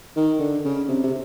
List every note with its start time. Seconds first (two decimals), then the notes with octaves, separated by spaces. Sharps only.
0.16 D#3
0.39 D3
0.65 C#3
0.88 C3
1.03 C3